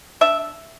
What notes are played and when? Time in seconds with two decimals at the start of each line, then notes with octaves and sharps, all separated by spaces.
0.21 D4 E5